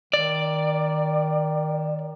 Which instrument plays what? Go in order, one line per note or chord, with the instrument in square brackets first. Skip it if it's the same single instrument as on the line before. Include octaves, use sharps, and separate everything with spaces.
[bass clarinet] D#3 [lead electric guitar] D5